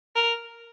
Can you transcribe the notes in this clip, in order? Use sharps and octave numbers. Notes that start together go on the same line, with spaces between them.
A#4